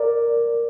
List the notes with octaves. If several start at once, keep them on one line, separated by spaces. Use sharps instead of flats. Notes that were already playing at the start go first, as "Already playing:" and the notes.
Already playing: A#4 D5